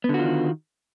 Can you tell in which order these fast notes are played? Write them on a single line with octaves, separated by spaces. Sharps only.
B3 D3 F#4 F4 D#3